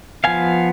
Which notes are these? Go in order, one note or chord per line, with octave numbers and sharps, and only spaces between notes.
F3 B3 F5 G#5